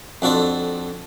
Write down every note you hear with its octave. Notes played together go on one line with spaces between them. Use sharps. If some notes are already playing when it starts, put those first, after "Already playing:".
F2 D4 F#4 A4 C5